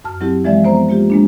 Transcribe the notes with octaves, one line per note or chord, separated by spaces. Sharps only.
F#2 A5 F6
F#3 C4 E4 G4
E3 F3 G#3 D5 E5
F3 B3 C5 A#5
G#3 A#3 F4 G4
G#3 A#3 D4